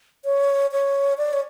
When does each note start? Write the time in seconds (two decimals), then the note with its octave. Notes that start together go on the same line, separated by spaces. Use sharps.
0.25 C#5
0.72 C#5
1.18 D5
1.33 C#5